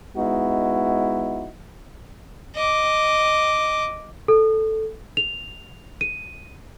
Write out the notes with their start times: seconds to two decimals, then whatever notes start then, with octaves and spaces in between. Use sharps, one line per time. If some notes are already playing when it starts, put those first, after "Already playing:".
0.17 G#3 B3 D#4 E4 F#4
2.56 D#5 D6
4.28 A4
5.17 F7
6.01 D#7